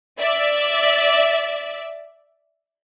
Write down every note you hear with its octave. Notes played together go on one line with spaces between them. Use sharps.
D5 E5